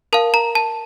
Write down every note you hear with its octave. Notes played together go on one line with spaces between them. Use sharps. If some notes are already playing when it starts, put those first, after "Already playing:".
A#4 F5 A5
A#5
A5